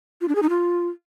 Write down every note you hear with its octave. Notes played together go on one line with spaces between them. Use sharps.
F4
D4
G#4
D#4
F4